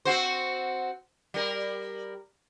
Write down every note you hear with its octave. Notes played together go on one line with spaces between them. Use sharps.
C4 F#4 C5
G3 A#4